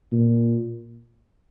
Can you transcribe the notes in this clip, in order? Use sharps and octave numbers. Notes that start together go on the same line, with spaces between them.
A#2